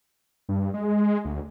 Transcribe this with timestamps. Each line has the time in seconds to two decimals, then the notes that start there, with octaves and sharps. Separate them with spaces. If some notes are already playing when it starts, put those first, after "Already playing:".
0.49 G2
0.74 G#3
1.25 D2